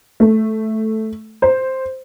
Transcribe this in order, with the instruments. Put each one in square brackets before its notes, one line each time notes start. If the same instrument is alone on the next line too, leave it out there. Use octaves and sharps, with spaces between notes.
[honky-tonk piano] A3
C5